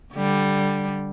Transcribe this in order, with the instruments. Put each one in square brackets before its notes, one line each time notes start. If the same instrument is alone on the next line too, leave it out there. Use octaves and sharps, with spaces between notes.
[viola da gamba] D3 G3